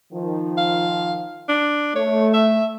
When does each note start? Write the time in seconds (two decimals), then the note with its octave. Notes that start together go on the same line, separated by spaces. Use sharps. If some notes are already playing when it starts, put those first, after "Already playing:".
0.13 D#3 F3
0.57 F5
1.48 D4
1.95 A3 C#5
2.34 E5